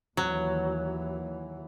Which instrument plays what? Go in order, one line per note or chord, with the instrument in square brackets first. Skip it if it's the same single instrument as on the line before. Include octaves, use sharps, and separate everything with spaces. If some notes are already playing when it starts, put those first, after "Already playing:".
[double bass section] D#2 E3 [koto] F#3